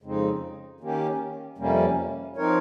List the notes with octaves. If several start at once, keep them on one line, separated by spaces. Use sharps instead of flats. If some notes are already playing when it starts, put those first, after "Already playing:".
F2 C#3 G#3 C4 D#4
D#3 A#3 C#4 G4
F2 C3 G3 A#3 C#4
F3 C4 D#4 A#4 C#5